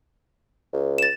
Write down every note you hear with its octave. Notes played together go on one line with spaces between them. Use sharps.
C#2
A6 E7